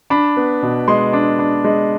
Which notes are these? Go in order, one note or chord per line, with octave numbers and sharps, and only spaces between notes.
D4 B5
B3
B2
G#3 C6
D4
D4
G#3